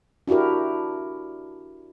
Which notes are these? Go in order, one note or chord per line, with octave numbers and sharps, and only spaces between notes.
D4 E4 F#4 G4 A#4